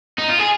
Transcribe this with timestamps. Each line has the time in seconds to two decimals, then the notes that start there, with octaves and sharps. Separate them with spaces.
0.19 D#4
0.30 F4
0.39 G#4